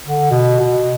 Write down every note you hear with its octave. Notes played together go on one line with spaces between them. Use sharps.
D3
B2
B2